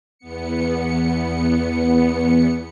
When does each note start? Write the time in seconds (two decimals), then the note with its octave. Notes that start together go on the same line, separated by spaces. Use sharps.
0.18 E2 B3 C#7